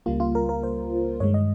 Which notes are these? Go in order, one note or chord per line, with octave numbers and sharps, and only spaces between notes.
C#2 C#3 G3 A#3 F4
F4
A#4
A#4
C5
G2 D#3 G#3 C#5
D#5